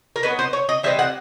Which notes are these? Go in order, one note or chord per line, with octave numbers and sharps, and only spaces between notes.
A#4
F#3 B3 D#4 B4
C5
C#5
D#5
E3 G3 C4 D#4 E5
F#5